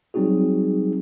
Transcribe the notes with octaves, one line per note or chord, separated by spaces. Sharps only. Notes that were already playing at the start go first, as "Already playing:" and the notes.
F#3 G3 C4 D#4 F#4 G#4